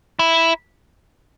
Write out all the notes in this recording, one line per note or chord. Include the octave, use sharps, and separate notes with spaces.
E4